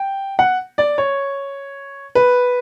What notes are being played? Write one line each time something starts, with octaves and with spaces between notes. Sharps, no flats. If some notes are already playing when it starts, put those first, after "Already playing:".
Already playing: G5
F#5
D5
C#5
B4